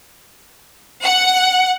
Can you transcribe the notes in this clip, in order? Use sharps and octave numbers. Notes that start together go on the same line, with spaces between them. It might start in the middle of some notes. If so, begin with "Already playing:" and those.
F#5